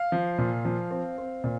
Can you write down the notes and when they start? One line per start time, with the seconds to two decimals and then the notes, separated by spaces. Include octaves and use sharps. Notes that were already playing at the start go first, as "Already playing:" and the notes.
Already playing: F5
0.12 F3
0.38 A#2
0.65 F3
0.91 C4
1.18 C4
1.44 A#2